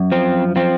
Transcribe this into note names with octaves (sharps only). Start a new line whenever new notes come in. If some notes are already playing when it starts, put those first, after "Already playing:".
Already playing: F#2
F3 C4
F3 C4